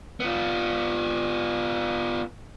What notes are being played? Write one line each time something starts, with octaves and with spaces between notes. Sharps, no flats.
B3 F4